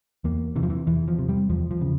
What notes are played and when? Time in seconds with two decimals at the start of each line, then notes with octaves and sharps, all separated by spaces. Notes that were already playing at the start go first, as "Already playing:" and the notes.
0.24 E2 A#3
0.56 C3 E3
0.63 F3
0.70 E3
0.87 E2 E3
1.08 F3
1.19 C3
1.29 G3
1.50 E2 F3
1.71 F3
1.81 C#3